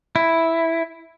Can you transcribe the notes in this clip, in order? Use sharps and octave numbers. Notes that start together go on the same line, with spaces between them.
E4